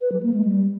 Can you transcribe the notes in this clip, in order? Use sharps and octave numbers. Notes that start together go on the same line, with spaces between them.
B4
F#3
A#3
G#3
G3